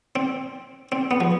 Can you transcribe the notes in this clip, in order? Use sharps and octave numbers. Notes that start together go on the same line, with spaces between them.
C4
C4
B3
F3